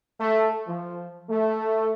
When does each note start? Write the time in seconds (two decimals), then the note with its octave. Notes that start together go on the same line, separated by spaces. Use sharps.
0.20 A3
0.67 F3
1.29 A3